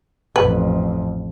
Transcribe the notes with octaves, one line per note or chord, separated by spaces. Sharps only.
A1 F2 B4